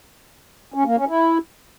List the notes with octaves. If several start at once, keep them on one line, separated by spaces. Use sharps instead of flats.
C#4
A#3
C#4
E4